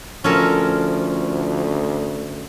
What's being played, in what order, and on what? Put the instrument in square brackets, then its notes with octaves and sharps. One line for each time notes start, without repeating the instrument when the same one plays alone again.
[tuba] D2 [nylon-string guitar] F3 [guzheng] C#4 A4 A#4